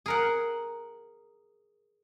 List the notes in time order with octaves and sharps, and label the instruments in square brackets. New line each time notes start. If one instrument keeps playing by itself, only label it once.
[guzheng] G#4 A#4 F#5